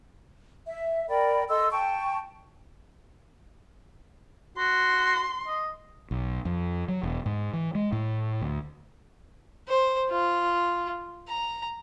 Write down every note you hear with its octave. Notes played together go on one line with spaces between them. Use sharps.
E5
A#4 D5 G5 B5
A4 D#5 C6 E6
G5 A5 C#6
F#4 C6
D#5
B1
F2
F#3
E1
G#2
E3
G#3
A2
D2
C5
F4
A#5